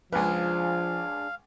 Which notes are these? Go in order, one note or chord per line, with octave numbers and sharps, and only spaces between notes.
C#2 F3 D4 G#4 B4 F5